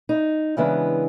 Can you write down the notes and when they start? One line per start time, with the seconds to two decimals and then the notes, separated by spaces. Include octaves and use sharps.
0.09 D#4
0.57 C#3 E3 G#3 B3 D4